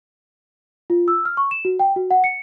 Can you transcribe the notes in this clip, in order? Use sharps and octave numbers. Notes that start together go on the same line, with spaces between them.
F4
E6
F6
C#6
E7
F#4
G5
F#4
F#5
C#7